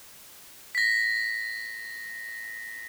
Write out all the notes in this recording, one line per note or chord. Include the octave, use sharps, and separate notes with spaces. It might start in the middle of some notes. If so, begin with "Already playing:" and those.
A#6 B6